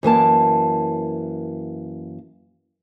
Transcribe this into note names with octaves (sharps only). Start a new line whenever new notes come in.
F#2 E3 A#3 A5